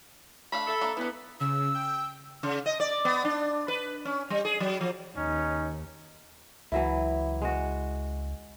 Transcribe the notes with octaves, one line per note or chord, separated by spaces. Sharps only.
A3 D4 F5 B5
A4 E5
A#3 D4
E3 B3 D4 E4
C#3 E6
G5
C#3
D#5
D5
B3
D4
B4
C#4
G3
G#4
F#3
F3
D#2 C#4 D#4
C#2 E3 F#3 E4
G#3 F#4